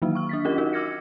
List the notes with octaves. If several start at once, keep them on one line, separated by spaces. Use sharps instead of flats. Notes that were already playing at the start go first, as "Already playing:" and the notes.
D#3 E3 F#3 A#3 D#4 E4
C#6 F6
D4 A6 B6
C#4 F4 G4 A#4 D#5 F#5
D#4 F#4 A#4
D6 E6 F6 G#6 A#6 C#7